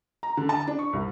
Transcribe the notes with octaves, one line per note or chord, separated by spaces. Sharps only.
A#5
D3
A5
D4
C#6
C2